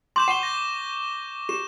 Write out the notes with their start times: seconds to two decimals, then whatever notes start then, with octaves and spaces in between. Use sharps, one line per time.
0.16 C6 D6 G6 E7
0.28 F#5 C#6 E7 G7
0.43 A#6
1.49 G4 E7